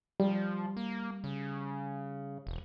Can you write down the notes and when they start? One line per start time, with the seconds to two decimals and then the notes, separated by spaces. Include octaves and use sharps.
0.20 F3 G3
0.77 A#3
1.24 C#3
2.47 E1